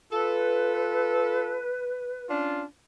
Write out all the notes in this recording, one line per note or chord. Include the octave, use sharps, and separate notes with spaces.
F4 A4 B4
C#4 D4 F4